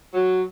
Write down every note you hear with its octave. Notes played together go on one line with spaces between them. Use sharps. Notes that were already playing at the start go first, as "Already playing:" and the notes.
F#3